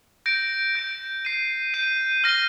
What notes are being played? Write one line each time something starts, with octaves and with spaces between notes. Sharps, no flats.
G6 A#6 D7
G6 A#6 D7
G6 C7 D#7
G6 C7 D#7
F6 A#6 D#7 G7